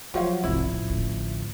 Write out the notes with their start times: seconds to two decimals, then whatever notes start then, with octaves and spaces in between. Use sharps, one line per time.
0.14 F3 F#3 F#4 C#5 F5
0.44 C2 G#2 E4
0.66 A1
0.90 A1 D2